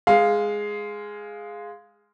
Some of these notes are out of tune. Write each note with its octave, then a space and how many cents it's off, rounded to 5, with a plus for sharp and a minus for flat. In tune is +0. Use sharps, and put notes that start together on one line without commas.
G#3 +0 F5 +0